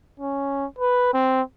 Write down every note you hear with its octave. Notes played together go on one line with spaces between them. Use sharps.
C#4
B4
C4